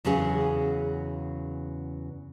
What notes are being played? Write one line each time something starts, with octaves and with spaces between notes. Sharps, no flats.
E2 C#3 F#3 C#4 G#4